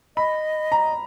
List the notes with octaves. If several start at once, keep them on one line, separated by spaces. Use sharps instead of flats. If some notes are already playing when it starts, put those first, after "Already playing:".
D#5 B5
A#5